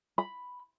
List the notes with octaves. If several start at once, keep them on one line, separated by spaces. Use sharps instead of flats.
B5